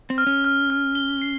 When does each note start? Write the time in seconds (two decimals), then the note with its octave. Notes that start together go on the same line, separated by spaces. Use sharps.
0.10 C4
0.18 F6
0.27 C#4
0.44 F6
0.70 F6
0.95 G7
1.22 C7